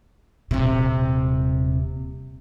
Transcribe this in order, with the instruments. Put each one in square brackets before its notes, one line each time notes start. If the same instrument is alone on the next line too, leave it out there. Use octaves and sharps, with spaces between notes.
[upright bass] D#1 C3